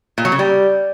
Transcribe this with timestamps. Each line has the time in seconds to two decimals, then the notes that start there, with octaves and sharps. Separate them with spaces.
0.18 A#2
0.25 F#3
0.32 C#3
0.39 G3